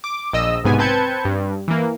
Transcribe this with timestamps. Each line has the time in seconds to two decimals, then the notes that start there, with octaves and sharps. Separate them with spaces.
0.04 D6
0.33 A#1 D#5 E6
0.64 B1 G#2 C3 B3 G#5
0.78 C4 B4 A5 G6 G#6 C#7
1.25 G2
1.68 E3 A#3